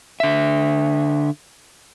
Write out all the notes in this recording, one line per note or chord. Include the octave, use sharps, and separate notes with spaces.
D3 E5